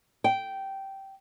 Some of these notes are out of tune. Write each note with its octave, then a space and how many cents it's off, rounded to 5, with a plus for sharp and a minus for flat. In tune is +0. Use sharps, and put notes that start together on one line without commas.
G5 -10